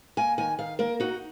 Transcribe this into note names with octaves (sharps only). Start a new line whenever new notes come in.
A#3 G#5
D#3 G#5
D#3 F5
A#3 A#4
D#4 F#4